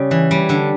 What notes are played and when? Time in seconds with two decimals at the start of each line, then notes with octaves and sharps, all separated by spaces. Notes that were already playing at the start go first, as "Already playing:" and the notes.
Already playing: C#3 G3
0.11 E3
0.31 G3
0.49 D3